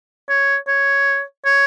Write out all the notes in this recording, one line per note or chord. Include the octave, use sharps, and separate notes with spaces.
C#5
C#5
C#5